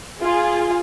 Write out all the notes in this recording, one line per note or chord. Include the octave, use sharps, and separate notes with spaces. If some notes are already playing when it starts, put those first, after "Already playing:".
F4 G#4